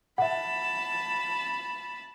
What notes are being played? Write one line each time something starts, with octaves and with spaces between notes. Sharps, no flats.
E5 F#5 A5 B5